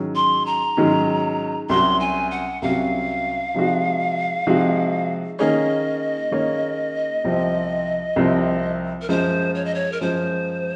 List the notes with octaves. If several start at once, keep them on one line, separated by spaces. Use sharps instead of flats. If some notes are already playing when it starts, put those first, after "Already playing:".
Already playing: G#2 D#3 F#3 C#4
C6
A#5
G#2 D#3 F#3 C#4
C2 C3 F#3 C#4 F#4 C6
G#5
F#5
C2 C3 F#3 C#4 F#4 F5
C3 F3 G#3 D#4 F#4
C3 F3 G#3 D#4 F#4
D#3 A#3 C#4 G#4 C#5 D#5
D#3 A#3 C#4 G#4 C#5
C2 C3 F3 C4
C2 C3 F3 C4
A#4
F#2 F3 G#3 C5
C#5
D#5
C#5
A#4
F#2 F3 G#3 C5